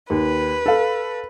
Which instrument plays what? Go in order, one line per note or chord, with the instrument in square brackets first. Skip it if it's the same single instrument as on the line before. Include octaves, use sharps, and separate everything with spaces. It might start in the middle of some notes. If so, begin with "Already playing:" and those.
[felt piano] D#2 [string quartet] B4
[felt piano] A4 F5